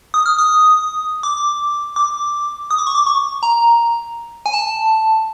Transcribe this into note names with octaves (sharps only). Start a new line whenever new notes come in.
D#6
F6
D#6
D6
D6
D#6
D6
C#6
D6
C#6
A#5
G#5
A5